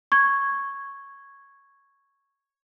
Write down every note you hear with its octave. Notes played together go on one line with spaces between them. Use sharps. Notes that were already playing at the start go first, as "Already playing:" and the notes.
C#6 G#6